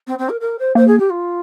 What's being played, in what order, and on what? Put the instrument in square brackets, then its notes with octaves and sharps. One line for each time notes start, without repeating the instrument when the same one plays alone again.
[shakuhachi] C4
C4
A#4
A#4
C5
[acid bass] A#3 [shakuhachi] C5
[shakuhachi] G#4
G4
F4